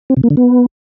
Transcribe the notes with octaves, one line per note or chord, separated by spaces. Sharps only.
C4
C3
A#3
D3
B3